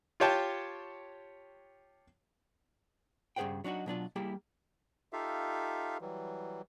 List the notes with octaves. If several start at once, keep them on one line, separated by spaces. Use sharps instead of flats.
F4 G4 C#5 G5 A5
G2 C#3 G#4 C5 F#5 G5
F#3 D4 D#4 F#4
B2 F#3 D4 F4
G3 A#3 E4 G4 G#4 E5
D#4 F4 G4 A4 E5 F5
E3 F#3 G3